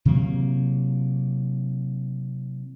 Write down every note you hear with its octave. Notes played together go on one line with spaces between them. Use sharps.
C3 E3 F#3 A#3